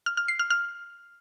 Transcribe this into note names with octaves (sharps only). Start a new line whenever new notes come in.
F6
F6
C7
F6
F6